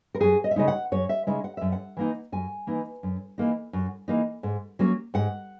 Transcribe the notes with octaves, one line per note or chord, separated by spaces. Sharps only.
A#4
F#2 G#4
D#5
E5
C#3 G#3 D#4 D#5
F#5
F#2 C#5
E5
C#3 G#3 D#4 E5
F#5
F#2 E5
F#5
E3 A#3 D#4
F#2 G#5
E3 A#3 D#4
F#2
E3 A#3 D#4
F#2
E3 A#3 D#4
G#2
F#3 A#3 C#4
G#2 F#5